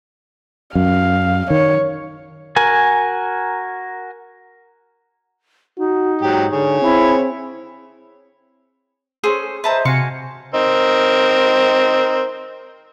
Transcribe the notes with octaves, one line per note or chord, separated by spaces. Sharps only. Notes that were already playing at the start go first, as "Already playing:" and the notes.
F#2 F5
D#3 C#5
F#4 A#4 G#5
D#4 F#4
G#2 F#3 G4
D3 G#4 C#5
C4 E4
C#4 G#4 A4 C5
B4 C5 D#5 E5 A5 A#5
C3 F#4 F5 G#5 C6 C#7
C4 D#4 A#4